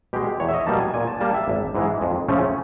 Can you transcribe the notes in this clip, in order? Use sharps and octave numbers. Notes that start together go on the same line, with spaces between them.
B2 G#3 G4
E2 C#5
E5
D#5
B2 G3 A#3 D#4 A5
G#5
A#2 G#5
A5
G3 A#3 A5
E5
G#1
G#2 E3 G#3
F2
C#3 F3 A3 C#4